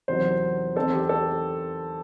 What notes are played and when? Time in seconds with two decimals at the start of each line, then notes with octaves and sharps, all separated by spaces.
0.08 E2 C3 D#3 F#3 C5
0.76 E2 D#3 A3 C4 A4
0.93 G4
1.09 A4